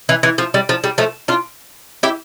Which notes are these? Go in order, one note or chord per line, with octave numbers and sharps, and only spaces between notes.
E3
E3
F3
G3
F3
G3
F3 A3
D4 F4
E4 G4